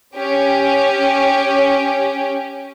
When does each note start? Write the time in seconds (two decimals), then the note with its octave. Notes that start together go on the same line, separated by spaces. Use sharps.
0.16 C#4 G4